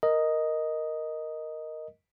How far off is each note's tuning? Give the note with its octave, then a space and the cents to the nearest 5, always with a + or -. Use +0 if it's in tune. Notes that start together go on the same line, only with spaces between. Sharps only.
A#4 +0 D#5 +0